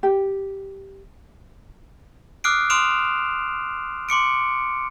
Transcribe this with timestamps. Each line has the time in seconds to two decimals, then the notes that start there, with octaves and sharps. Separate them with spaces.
0.03 G4
2.44 D6 D#6 F6 F#6 C7 D7
2.70 C6 D#6 F6 D7 E7 F7
4.09 C6 D6 C#7 D7